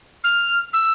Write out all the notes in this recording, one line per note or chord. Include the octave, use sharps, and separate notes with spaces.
F6
E6